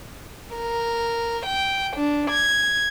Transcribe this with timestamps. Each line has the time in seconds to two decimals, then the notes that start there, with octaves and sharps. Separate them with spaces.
0.55 A#4
1.46 G5
1.96 D4
2.30 G#6